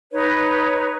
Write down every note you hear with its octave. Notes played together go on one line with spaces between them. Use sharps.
D#4 B4 C#5